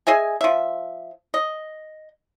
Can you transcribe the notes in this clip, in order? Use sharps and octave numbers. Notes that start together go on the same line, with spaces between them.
G#4 D#5 E5 G#5
F3 E5
D#5